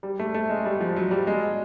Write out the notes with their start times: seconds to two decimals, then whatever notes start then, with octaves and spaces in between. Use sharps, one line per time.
0.03 G3
0.19 A3
0.34 A3
0.50 G#3
0.65 G3
0.81 F3
0.96 F#3
1.11 G3
1.27 G#3